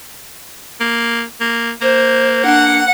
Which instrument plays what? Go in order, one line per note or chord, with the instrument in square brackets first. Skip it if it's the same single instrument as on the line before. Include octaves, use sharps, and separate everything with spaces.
[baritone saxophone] A#3
A#3
[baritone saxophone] A#3 [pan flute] C5
[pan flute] D4 [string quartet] F#5